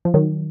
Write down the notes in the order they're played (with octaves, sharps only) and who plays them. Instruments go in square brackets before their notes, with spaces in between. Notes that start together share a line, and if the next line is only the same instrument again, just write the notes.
[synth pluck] F3
D#3 F#3